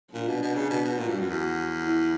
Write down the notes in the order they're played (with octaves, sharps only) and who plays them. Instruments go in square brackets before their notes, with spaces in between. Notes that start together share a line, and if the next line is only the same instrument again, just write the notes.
[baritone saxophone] A#2 [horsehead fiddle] D4
[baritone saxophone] B2
B2
C#3
B2
B2
[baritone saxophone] A#2 [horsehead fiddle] F#4
[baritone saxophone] G2
F#2
E2
[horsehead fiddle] E4